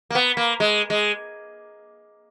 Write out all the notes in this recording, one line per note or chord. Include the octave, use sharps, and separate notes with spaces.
A#3
B3
A#3
G#3
G#3